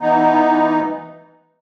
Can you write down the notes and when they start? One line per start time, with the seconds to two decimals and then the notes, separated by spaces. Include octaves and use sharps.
0.01 E3 B3 D#4